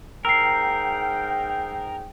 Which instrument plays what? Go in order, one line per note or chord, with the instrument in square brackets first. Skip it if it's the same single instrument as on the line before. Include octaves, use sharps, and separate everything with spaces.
[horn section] G#2 G#4 G5 [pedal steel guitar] A#4 [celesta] E6 C7